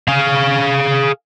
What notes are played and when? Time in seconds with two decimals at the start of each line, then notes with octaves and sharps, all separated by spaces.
0.08 G#4 F5